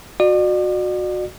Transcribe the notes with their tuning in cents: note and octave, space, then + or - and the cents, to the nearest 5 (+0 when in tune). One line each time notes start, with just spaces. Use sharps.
F#4 -20 D5 +40